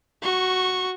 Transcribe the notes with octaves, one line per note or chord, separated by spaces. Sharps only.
F#4 C#6